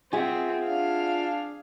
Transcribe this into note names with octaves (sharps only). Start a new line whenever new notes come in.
C4 F4 G#4 E5 F#5
D4 F5